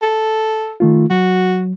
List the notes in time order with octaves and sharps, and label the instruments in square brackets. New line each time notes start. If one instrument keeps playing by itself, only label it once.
[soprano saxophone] A4
[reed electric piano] D#3 A3 F4
[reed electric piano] F#3 [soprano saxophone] F#4